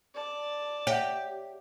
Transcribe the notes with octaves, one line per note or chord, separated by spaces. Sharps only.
D5 A5
G4 C#5 E5 F#5